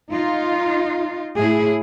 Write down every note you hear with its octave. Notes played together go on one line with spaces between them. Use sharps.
D#4 F4
A2 E4 G#4